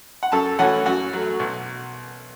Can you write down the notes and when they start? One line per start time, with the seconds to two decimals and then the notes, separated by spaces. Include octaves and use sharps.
0.23 F#5
0.32 F#2 A4 A5
0.59 E3 A3 C#4 F#4 F#5
0.86 F#2 F#4 F#5
1.13 F#3 A3
1.39 B1